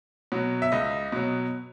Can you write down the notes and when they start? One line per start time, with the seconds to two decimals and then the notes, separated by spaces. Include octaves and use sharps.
0.32 B2 F#3
0.62 E5
0.72 C#2 D#5
1.12 B2 F#3